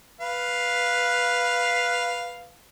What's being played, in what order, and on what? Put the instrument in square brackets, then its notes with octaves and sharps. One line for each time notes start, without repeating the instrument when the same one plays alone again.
[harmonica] B4 F5